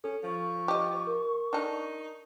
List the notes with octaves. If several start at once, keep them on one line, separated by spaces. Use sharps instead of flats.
C#4 A4
F3 C#6
G4 D#5 D6
A#4
D4 D#4 A4